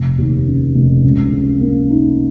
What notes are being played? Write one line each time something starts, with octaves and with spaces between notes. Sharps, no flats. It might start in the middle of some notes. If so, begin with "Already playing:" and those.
Already playing: F1
D#2
C#3
F1
C#2
C#3
A#3
D#4